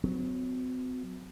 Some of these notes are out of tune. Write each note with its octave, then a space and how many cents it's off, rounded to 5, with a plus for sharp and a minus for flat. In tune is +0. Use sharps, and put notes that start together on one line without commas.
F#3 -10 C4 -45